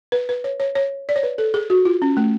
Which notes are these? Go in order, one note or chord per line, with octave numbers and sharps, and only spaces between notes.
B4
B4
C#5
C#5
C#5
D5
C#5
B4
A4
G#4
F#4
F4
C#4
A3